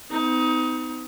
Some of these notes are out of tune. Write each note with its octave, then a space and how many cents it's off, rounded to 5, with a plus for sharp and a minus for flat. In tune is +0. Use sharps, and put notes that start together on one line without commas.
C4 -45 D#4 +25